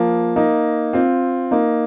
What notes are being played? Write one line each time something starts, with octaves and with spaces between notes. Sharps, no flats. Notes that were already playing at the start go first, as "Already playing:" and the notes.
Already playing: F3 A#3
A#3 D#4
C4 F4
A#3 D#4